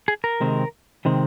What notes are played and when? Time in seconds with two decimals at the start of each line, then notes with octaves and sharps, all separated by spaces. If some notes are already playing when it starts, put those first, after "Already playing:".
0.08 G#4
0.24 A#4
0.40 C3 D#3 G#3 C4
1.05 C3 D#3 G#3 C4